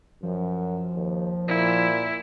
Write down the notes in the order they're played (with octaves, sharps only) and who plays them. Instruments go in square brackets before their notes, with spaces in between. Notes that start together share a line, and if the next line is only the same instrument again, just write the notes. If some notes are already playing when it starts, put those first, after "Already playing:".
[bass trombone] F#2 [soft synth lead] F3
[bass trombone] D#2
[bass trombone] A#2 [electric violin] E4